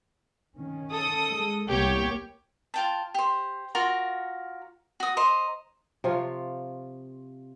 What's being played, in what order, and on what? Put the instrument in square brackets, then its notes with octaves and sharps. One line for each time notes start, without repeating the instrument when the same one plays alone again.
[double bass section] D#3 C#4
[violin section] A4 D#6
[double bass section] G#3
[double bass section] C2 A#3 B3 [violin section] G4 C#5
[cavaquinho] F4 G5 A5
G4 C5
F4 F#4 A#4
F#4 D#6
C5 D#5 A#5
[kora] C3 F3 F4 C#5